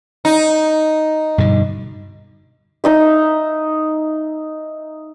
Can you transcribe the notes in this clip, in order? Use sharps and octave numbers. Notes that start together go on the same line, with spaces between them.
D#4
G2 B2 D3
D#4 D#5 E5